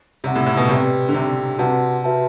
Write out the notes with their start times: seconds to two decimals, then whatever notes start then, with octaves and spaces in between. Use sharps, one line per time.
0.24 C3 G4 D5 F#5
0.36 A2
0.47 A2
0.57 B2
0.69 C3 G4 B4 D5 G5
1.09 D3
1.14 C3 G4 D5 G5
1.59 C3 F#4 B4 D5 F#5 A5
2.04 F#4 B4 E5 A5